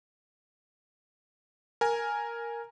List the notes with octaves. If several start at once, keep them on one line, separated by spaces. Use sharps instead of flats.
A#4 G#5